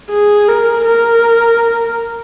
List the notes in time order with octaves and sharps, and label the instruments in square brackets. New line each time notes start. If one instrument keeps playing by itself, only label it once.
[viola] G#4
A#4
A#4